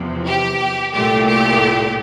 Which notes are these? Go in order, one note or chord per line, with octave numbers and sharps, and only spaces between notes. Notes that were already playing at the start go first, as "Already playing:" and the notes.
Already playing: E2 C3 F3
G4
C2 A#2 A3 G4
G4